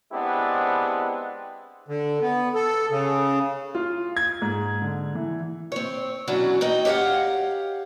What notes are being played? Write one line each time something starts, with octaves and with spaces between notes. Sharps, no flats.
G#3 B3 C4 D4 E4 G4
D3
B3
A4
C#3
F4
G#6
G#2
D3
E3
C4 C#5
B2 E3 F#3 C#4 D4 F#4
D#4 F#4 D#5 G5
G4 C#5 D#5 F5 F#5